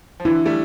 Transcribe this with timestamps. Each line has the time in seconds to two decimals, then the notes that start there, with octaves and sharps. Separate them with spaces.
0.20 F3
0.25 D3 E3 E4
0.46 G3 A3